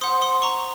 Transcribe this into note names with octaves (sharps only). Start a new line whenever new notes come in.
C5 F#5 C6 D#6
C6 D#6
A#5 C#6